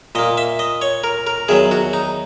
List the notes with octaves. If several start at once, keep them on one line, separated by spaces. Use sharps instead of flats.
A#2 A#3 D#5
E5
D#5
C#5
A#4
A#4
E2 D#3 F#3 G#4
F#4
D#4